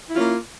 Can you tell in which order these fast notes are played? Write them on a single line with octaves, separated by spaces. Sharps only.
E4 F4 C#4 A#3